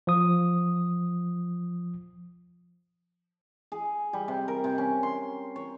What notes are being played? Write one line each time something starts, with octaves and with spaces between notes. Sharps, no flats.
F3 D#6
G#4
G3
C3
A#4
C3
C#4
C6
C#5